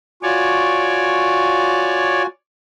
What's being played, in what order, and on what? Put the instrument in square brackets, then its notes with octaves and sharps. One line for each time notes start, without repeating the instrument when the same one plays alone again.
[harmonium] F4 F#4 G#5 [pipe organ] C#5 D5